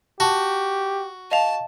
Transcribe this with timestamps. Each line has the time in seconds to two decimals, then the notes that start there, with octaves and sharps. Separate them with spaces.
0.20 F#4 G4 A5
1.31 D#5 F5 A5 F7